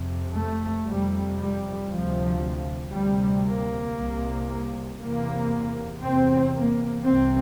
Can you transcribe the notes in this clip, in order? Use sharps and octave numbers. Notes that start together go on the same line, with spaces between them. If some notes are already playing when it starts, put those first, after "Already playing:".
Already playing: F2 C3
A3
F2 C3 G3
G3
D2 C3 F3
D2 C3 G3
A#3
C2 C3
E2 C3 A#3
E2 C3 C4
A#3
C2 C3 C4